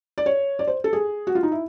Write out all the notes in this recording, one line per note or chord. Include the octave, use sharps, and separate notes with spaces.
D5
C#5
D5
C5
A4
G#4
F#4
F4
D#4
E4